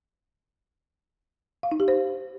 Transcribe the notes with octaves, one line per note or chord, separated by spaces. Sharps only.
F5
D#4
G4
C5